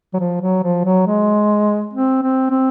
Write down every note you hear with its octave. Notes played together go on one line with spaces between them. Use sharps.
F#3
F3
F#3
F3
F#3
G#3
C4
C4
C4